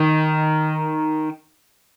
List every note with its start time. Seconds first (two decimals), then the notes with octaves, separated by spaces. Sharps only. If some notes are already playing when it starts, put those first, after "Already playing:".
Already playing: D#3